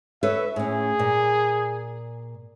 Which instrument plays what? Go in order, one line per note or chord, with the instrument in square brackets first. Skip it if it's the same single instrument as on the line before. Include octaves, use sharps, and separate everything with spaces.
[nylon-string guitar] A4 B4 C#5 [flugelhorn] E5
[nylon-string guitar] A2 C#4 [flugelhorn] G#4
[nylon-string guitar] A#2